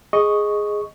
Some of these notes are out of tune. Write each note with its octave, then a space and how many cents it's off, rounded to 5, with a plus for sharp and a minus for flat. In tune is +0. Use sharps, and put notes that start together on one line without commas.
G#4 +0 D#5 +0 C#6 +0